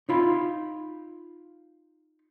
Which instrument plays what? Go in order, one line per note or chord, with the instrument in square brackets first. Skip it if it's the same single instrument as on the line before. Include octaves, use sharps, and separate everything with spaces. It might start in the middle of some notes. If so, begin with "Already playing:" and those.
[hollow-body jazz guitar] D#4 F4 B5